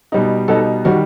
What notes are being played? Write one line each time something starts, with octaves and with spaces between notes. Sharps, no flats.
B2 G3 D#4
B2 G3 D#4 A4
D#3 G3 F#4